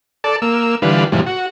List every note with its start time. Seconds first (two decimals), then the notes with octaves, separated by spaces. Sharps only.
0.24 A4 D5 A5
0.42 A#3 E6
0.82 D3 E3 G3 F4 B4
1.12 G#2 C3 E3 F3 G3
1.26 F#4